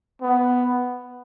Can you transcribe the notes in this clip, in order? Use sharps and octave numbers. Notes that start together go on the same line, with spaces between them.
B3